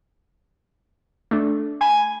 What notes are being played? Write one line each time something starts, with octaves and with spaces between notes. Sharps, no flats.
A3 D4
G#5 B5